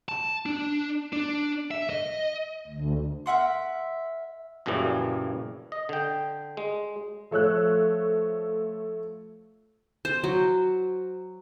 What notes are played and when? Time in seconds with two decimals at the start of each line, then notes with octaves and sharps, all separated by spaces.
0.09 A5
0.46 D4
1.13 D4
1.71 E5
1.90 D#5
2.67 D2
3.26 A#4 E5 F#5 C6
4.66 A#1 F#2 A#2 C#3 E3 G3
5.72 D#5
5.89 D3 G5
6.57 G#3
7.31 F3 A3 C#5 E6 F#6
10.05 C5
10.24 F#3